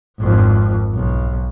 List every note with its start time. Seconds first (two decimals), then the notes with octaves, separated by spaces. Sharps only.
0.20 G#1 F2
0.94 B1